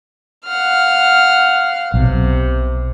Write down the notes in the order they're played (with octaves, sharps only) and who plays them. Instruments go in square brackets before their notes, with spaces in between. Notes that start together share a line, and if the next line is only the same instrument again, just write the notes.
[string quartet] F5 F#5 F6
[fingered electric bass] B1 [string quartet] C3